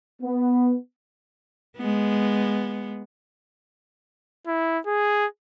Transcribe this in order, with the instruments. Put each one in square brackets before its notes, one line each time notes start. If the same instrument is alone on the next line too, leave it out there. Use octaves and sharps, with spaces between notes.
[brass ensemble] B3
[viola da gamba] G#3 B3
[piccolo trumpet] E4
G#4